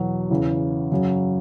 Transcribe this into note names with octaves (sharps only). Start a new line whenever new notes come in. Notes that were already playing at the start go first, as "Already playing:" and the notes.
Already playing: E2 B2 F#3
E2 C#3 E3
F#2 C#3 F#3